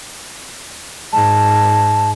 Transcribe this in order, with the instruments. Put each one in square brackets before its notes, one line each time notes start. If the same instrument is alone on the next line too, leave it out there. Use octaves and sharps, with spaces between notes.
[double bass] G#2 [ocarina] A5